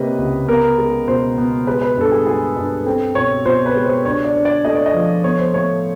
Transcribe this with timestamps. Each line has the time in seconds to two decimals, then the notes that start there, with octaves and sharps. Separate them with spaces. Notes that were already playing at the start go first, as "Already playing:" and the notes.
Already playing: C3 A#3 B4 C#5 D#5
0.18 C#2
0.48 B3 A#4
0.78 G#3
1.08 B2 C5
1.38 B3
1.67 G#3 B4
1.81 B4
1.97 G2 A4
2.12 G#4
2.27 G#3 G#4
2.56 G2
2.85 C4 A4
3.15 B2 C#5
3.46 B2 C5
3.66 B4
3.75 G#3
3.85 C5
4.05 D4 C#5
4.25 D5
4.35 D4
4.45 D5
4.65 A3 D#5
4.75 D5
4.86 D#5
4.94 F3
5.24 B3 C#5
5.39 C5
5.54 A2 C#5